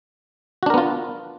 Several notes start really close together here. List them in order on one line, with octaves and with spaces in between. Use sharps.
F#4 D4 A#4 B3 F4